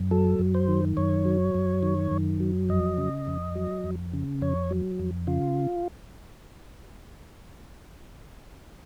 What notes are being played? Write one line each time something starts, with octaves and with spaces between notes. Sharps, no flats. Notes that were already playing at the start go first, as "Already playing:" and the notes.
Already playing: F#2
F#3 A4
F#2
C5
D#3
F#2 C#5
F#3
F#2
D#3
F#2
F#3
F2 D#5
C#3
F2
F#3
F2
C#3
F2 C#5
F#3
F2
C#3 F4